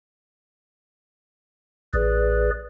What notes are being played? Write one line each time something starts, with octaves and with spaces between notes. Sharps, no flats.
A1 G#4 B4 D5